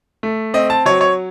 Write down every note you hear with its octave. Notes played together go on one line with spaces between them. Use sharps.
A3
C4 D#5
A5
F#3 C#5
C#5